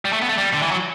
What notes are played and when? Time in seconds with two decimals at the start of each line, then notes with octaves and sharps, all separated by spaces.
0.05 G3
0.13 A3
0.22 B3
0.29 A3
0.38 G3
0.54 D3
0.62 E3
0.71 F#3